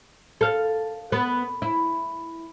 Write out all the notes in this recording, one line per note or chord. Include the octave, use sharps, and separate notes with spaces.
A4 F5
B3
E4